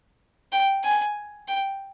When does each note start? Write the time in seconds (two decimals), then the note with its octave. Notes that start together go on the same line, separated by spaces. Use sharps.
0.52 G5
0.84 G#5
1.48 G5